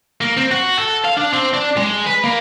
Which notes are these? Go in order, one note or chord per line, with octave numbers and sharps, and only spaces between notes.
A#3
C4
F#4
A4
F5
D4
C4
D4
G#3
B4
A#3